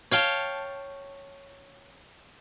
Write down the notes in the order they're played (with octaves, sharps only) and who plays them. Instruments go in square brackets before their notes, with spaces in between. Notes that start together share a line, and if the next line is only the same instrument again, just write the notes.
[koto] C#5 F5 G5 A5